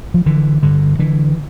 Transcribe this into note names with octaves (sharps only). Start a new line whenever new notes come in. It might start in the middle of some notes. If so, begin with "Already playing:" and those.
F3
D3 E3
G2 D3
D3 E3